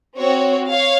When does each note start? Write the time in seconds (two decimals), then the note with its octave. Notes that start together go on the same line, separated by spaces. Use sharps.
0.17 C4 F#4 C#5
0.69 C#5 F5